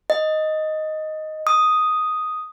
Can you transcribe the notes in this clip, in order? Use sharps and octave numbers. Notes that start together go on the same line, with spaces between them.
D#5
D#6